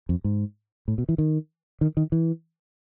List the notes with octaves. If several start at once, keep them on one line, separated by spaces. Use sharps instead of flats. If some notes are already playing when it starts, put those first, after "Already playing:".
F2
G#2
A2
B2
E3
D#3
D#3
D#3
E3